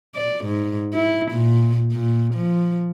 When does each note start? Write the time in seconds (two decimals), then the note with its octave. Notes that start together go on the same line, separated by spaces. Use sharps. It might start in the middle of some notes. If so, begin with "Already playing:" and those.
0.15 D5
0.45 G#2
0.94 E4
1.31 A#2
1.92 A#2
2.34 F3